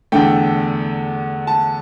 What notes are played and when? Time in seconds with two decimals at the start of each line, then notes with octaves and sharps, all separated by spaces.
0.12 E2 D3 A3 G5
1.47 A5